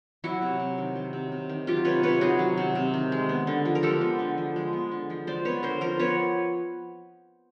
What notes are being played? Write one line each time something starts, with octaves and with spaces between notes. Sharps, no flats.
F#3 E4 F#4
C3
C3
D#3
F#3
C3
C3
D#3
F#3 F4 G4
C3 B4 C#5
C3 B4 C#5
D#3 F#4 G#4
F#3
C3
C3
D#3
G#3
B3
D3
F3
A#4
G#3 G4 A4
B3
D3
F3
G#3
B3
D3
F3
G#3 C5 D5
B3 B4 C#5
D3 A#4 C5
F3 A#4 C5
B3 B4 C#5